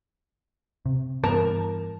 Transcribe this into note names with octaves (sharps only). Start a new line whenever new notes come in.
C3
G2 E3 B3 A#4 A5